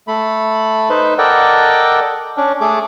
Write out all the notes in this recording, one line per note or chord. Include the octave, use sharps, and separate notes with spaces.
A3 B5
D#4 B4 C5
A4 A#4 D5 D#5 F#5 G5
C#4 D4
A3 G#4 D6